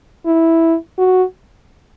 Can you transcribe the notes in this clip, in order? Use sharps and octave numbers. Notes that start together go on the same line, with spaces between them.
E4
F#4